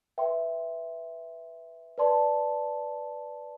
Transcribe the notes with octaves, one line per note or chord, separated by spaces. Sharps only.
B4 E5 G5 C6
B4 D5 A5 C6